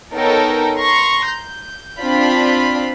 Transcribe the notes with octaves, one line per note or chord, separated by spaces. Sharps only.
B3 D#4 A4 A#4 C#5 G5
A#5 C6 C#6
G6
C4 D4 F4 F5 B5